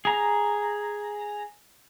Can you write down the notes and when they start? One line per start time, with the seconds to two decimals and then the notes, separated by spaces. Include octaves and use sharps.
0.05 G#4 A#5